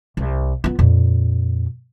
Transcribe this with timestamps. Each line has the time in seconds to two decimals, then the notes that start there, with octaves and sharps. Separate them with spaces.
0.17 C2
0.64 B3 F4
0.79 F2 A#2